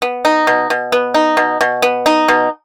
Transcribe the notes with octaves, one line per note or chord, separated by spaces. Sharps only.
B3
D#4
B2
B2
B3
D#4
B2
B2
B3
D#4
B2